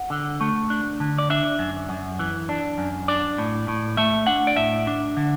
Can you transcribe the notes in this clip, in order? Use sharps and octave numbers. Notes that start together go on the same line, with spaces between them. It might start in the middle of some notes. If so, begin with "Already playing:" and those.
Already playing: F#5
D3
A3
D4
D3
D5
D4 E5
F#2
F#2
E3
D4
F#2
D4 D5
A2
A2
A3 E5
D4 F#5
D5
A2 E5
D4
D3